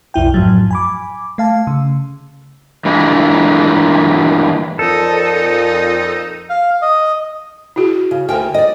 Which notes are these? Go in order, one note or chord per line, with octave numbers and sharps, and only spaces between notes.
B1 F2 E4 G5
F#2 A2 F3 F#3
G#5 B5 D6
A3 F5 A5
C#3
G2 A#2 E3 G#3 A3
F2 A#2 D#4 A4
F5
D#5
E4 F#4 G#4
C#3
D2 A#4 C5 G5 G#5
D5 D#5